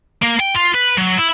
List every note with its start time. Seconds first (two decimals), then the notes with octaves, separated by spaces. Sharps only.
0.22 A#3
0.40 G5
0.55 F4
0.74 B4
0.98 F#3
1.17 E4